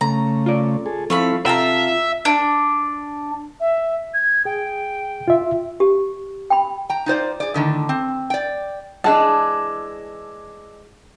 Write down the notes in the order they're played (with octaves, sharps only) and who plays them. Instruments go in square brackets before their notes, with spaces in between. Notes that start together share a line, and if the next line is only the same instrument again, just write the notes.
[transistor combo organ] C#3 A3 [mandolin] A#5
[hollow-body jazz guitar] F4 D5
[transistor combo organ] G#4 A4
[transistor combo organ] F3 C4 E4 [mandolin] A3 F5 B5
[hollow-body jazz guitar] C3 G5 [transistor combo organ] F4 [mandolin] A4 F5 A#5 [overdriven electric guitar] E5
[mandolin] D4
[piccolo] E5
G#6
[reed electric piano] G#4 [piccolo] G5
[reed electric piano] F4 E5
[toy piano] G4
G5 B5
[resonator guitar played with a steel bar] G5 A#5
D#4 F4 C5 D5
G#4 D5
A2 D3 D#3
C4
D5 G5
[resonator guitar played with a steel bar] E3 G#3 D4 [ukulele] A5